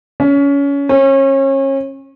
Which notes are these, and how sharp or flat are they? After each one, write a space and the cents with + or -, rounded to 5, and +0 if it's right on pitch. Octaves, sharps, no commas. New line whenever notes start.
C#4 +25
C#4 -30